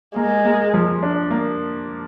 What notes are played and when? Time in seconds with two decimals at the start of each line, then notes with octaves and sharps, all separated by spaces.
0.16 G#3 A#3
0.45 A#3
0.74 F3
1.03 D4
1.31 A#3